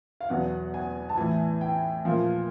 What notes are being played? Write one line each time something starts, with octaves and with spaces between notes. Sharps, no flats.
F5
E2 B2 F#3 F#5
G#5
A5
A2 E3 G#5
G5
A#2 F3